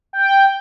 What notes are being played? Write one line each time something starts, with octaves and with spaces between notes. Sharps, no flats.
G5